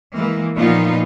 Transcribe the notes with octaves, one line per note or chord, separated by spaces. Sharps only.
E3 G#3 A#3
A#2 F3 B3 D#4 F4